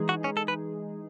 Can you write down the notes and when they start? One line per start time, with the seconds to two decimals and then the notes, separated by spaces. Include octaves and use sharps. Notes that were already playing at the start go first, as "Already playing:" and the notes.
Already playing: E3 G#3 D#4 G#4
0.09 F#4
0.24 C#4
0.37 A4
0.48 B4